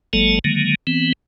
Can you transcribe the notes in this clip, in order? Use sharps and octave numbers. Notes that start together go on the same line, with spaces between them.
G1 F#3 G#3 A#3 A4 A5
D3 D#3 F#3 G#3 A#3
E3 B3 C4